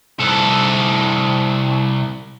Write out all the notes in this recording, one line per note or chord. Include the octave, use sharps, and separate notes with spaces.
C2 A4